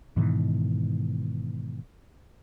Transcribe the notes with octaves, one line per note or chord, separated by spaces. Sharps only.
G#2 B2 D#3 E3